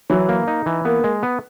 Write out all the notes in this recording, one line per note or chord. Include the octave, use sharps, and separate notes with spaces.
E3 F#3
A#3
D#4
E3
A#3 B3
G#3
B3